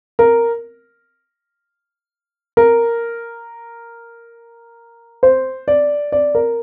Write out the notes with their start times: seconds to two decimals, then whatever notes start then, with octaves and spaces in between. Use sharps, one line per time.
0.19 A#4
2.57 A#4
5.23 C5
5.68 D5
6.12 D5
6.35 A#4